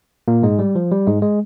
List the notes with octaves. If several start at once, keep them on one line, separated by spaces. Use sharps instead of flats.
A#2 A#3
G#2 G#3
G3
F3
G3
G#2 G#3
G#3